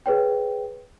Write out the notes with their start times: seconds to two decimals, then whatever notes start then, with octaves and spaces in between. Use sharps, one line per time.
0.06 G#4 B4 C#5 G5